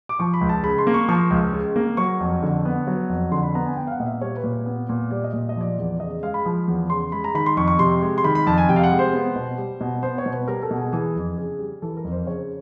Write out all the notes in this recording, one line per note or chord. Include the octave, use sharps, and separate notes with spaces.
D6
F3 C#6
B5
C#2
A5
C#3 B5
C6
A#3
C#6
F3 C#6
C#2
C#3
A#3
F#3 C#6
F2
D3
B3
F#3
F2
D3 C6
B5
B3 A#5
G#5
B3 G5
F5
F#5
A#2 D#5
E5
G3 C#5
B4
A#2
B3
A#2
G3 D5
D#5
A#2 D5
D#5
F3 D5
E2
C#3 D#5
G#3 F5
B5
F3
E2
C#3 C6
G#3 B5
A#5
D#3 B5
C6
F2 C#6
C#6
C3 C6
G#3
C6
D#3 B5
B5
F2 A5
G#5
C3 G5
F5
F#5
G#3
C5
B3
B2
G3
B2
B3 C5
C#5
B2
B4
G3 A#4
A4
B2
G#4
E3 G#4
F2
C#3 G#4
G3
E3 A4
A#4
F2
C5
C#3 C#5